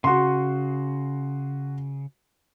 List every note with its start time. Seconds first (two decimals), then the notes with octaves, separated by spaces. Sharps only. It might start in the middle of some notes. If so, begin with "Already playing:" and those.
0.04 C#3 F#4 C6